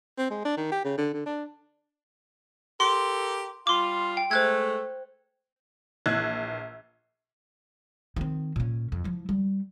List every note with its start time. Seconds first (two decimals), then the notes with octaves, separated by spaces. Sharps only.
0.18 C4
0.30 G#3
0.45 D4
0.57 D#3
0.72 G4
0.84 C#3
0.98 D3
1.13 D3
1.26 D4
2.80 G4 A4 A#4 C6
3.67 G3 F4 C6 D6
4.17 G5
4.31 G#3 A3 C5 F#6 G#6
6.06 A#1 E3 E6 F#6 G#6
8.16 D#3 C4
8.56 A#2 C#4
8.92 F2
9.04 F3 E4
9.29 G3